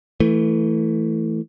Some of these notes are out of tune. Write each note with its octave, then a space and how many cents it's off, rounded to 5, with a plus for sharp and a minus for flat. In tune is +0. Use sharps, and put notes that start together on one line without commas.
E3 +0 A3 +15